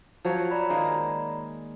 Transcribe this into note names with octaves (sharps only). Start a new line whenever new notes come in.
F3 F#3 C#5
D5 A#5 B5
D#3 G#3 A#3